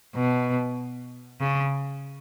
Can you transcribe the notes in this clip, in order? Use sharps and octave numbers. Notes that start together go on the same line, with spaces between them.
B2
C#3